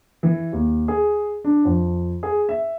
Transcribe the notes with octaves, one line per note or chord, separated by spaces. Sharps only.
E3
D#2
G#4
D4
F2
G#4
E5